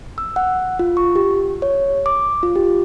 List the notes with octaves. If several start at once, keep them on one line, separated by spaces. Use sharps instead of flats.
E6
F#5
F4
C#6
G4
C#5
D6
F4
G4